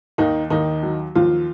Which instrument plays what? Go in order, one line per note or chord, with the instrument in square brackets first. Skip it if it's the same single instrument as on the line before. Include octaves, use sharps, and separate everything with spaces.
[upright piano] D#2 D#3 D#4
D#2 D#3 D#4
F#3
D#2 F3 F4